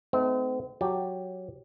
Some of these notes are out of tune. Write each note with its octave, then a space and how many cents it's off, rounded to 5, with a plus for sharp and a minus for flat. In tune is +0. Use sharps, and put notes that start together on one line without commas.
A3 -20 C4 -40 D#4 +0
F#3 +0 G4 +0 A5 +0